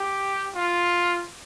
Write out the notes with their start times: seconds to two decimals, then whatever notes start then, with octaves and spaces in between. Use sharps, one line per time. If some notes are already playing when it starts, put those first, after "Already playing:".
Already playing: G4
0.56 F4